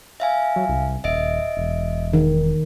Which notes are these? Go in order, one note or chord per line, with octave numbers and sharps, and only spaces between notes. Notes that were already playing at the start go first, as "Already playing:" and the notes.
E5 F5 G#5
F#3
C2
D#1 D#5 E5 D7
E1
D#3